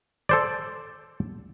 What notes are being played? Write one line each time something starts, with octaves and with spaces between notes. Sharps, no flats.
A4 C5 D5